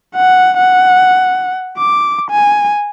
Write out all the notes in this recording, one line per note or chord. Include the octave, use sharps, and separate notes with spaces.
F#5
F#5
D6
G#5